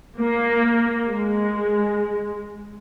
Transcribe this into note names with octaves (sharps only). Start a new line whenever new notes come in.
A#3
G#3